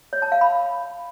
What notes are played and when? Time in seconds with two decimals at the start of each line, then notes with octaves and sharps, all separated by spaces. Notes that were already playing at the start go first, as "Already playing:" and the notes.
0.13 C#5
0.22 A5
0.32 F5
0.41 B5